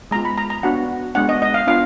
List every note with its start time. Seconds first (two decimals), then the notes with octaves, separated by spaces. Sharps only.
0.11 G#3 B3 F4 A#5
0.25 B5
0.38 A#5
0.50 A#5
0.63 B3 D4 F#4 F#5
1.15 G#3 B3 D4 F#5
1.29 D#5
1.42 D#5
1.54 F5
1.67 B3 D4 F4 F5